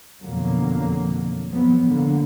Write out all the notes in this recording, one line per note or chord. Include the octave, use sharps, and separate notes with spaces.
F2 B2 D3 F#3 A#3
F3 F#3 B3
D3 A#3